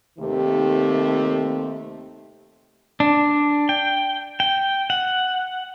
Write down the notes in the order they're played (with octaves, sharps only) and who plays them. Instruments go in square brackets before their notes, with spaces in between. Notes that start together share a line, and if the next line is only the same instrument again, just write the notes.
[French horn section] D#2 C3 D#3 A3 C4 G4
[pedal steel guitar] D4
G5
G5
F#5